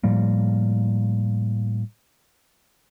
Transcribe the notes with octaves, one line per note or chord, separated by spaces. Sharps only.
A2 F3 G3 A#3